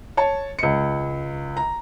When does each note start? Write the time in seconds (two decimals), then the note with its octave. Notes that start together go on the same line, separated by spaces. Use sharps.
0.17 C#5 A5
0.59 C#2 C#7
1.57 A#5